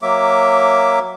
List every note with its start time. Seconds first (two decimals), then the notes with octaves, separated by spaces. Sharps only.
0.02 F#3 A#3 E5 D6